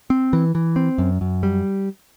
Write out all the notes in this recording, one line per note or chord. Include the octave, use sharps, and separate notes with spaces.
C4
E3
E3
C4
F#2
F#2
G3